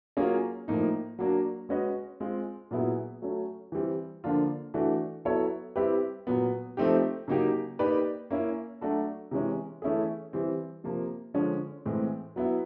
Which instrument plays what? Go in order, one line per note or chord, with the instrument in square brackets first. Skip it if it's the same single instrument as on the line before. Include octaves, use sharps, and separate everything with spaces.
[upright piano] F#3 A#3 C#4 F4 G#4
A2 F3 A#3 D#4
F#3 A#3 D4 F#4
G#3 C#4 F#4 B4 D#5
G#3 C4 F4
A#2 F#3 B3 E4 G#4
F#3 A3 C#4
E3 G3 C4
D3 F3 A#3 D4 F4
E3 A3 D4 F#4
F#3 B3 E4 A4 C#5
G3 C4 E4 G4 B4
A#2 F#3 B3
F3 A3 C4 D#4 G4
C#3 F#3 A#3 D#4 G4
A#3 D#4 G4 B4 D5
A#3 C#4 E4
F#3 A3 D4 F#4 A4
C3 E3 G#3 C#4
E3 A3 C#4 E4 G#4
E3 G3 C4
C3 F3 A#3
D3 F3 G#3 C#4
A2 E3 G#3 C4
F#3 B3 E4